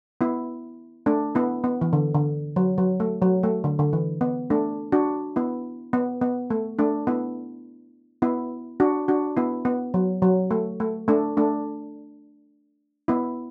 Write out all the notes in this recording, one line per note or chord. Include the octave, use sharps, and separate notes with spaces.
B3 E4
A3 D4
B3 E4
B3
E3
D3
D3
F#3
F#3
A3
F#3
A3
D3
D3
E3
B3
A3 D4
D4 F#4
B3 E4
B3
B3
A3
A3 D4
B3 E4
B3 E4
D4 F#4
D4 F#4
B3 E4
B3
F#3
F#3
A3
A3
A3 D4
A3 D4
B3 E4